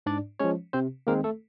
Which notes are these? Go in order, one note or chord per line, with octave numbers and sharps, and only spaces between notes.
G#2 D4 D5
F3 G#3 C#4 C#5
C3 C4 C5
D#3 G#3 A#3 C4 A#4
A3 A4